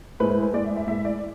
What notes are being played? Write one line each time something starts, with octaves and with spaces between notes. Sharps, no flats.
A2 G#3 B4
B4
B4
A2 G#3 D5
E5
E5
A2 G#3 E5
D5